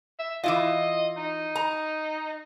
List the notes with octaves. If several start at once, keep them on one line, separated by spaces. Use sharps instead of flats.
E5
E3 E4 F4 D#5
D#4
A#5